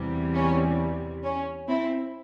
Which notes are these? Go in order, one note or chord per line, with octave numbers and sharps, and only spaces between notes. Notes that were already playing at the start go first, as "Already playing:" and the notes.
Already playing: E2 C3 E3 G3
C#4
C#4
C4 E4